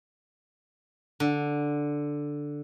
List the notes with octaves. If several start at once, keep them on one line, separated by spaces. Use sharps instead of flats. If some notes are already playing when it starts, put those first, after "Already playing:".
D3